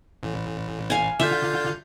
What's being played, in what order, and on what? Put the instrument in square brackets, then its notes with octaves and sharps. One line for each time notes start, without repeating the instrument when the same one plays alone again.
[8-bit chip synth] A1
[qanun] F5 G#5
[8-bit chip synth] D3 F4 G6 [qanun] E5